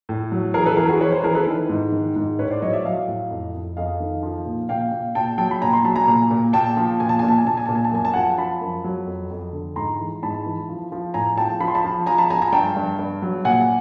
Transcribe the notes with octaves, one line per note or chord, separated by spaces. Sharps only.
A2
F#3
E3 G#4 A#4
A4 B4
E3 G#4 A#4
F#4 G#4
E3 B4 C#5
A#4 C5
E3 G#4 A#4
A4 B4
D#3
G#2
D#3
G#2
A2 B4 C#5
C5 D5
F#3 C#5 D#5
D5 E5
F#3 D#5 F5
A2
F2
F2
F2 D#5 F5
D#3
F3
A#2
A#2 F5 G5
A#2
A#2 G5 A5
F#3 G5 A5
B5
A#2 G#5 A#5
A#5 C6
F#3 A5 B5
G#5 A#5
A#2
A#2
A#2 G5 A5
F3
A#2 G#5
A5
A#2 G#5
A5
G#5
A#2 A5
G#5
A#2 A5
G#5
A5
F#2 G#5
A5
F3 F#5 G#5
F3 A5 B5
F#2
F#3
F2
F2
D3
G#2 A#5 C6
E3
G#2 A5 B5
E3
F3
F3
A2 G#5 A#5
F3 G5 A5
F3 B5
C6
A5 B5
F3
F3 G#5 A#5
A5 B5
F3 G#5 A#5
G#5 A#5
G2 G5 A5
G2
G2
F#3
A#2 F#5 G#5